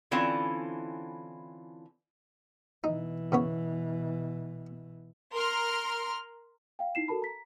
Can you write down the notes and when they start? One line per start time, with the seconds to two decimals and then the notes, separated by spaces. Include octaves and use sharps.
0.11 D3 E3 C4 C#4 E4 F4
2.84 B2 E3 D#4
3.32 C#3 B3 C#5
5.34 A#4 C6 F6
6.79 F5 G5
6.95 D#4 E4 C7 E7
7.08 F#4 A4 A#4 A5 B5
7.22 A#5 B6